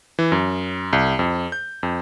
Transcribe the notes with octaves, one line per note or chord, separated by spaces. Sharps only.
E3
F#2
C2
F2
G6
F2